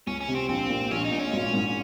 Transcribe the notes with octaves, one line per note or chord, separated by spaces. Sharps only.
C#2 C#4
C#4
C3
C4
A#1 C4
A#2
A#1 C#4
D#4
A#2
C#4
G#1
G#2